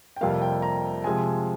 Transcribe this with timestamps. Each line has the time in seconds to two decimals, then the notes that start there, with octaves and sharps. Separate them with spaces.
0.16 G5
0.21 F2 C3 G3 A#3 F5
0.32 F5
0.42 G5
0.62 A#5
1.04 C3 F3 G#3 G#5